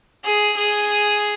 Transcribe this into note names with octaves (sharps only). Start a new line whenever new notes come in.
G#4
G#4